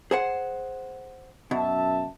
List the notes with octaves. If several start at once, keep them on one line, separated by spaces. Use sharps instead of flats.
G#4 C5 F#5
F#2 B2 E5 A5